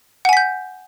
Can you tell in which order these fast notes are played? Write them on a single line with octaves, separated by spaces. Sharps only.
F#5 G#5 B6 G6